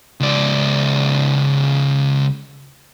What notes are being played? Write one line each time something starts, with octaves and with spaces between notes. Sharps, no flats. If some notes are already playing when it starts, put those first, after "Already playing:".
C#2 D5